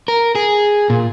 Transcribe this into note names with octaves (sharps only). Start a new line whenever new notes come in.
A#4
G#4
A#2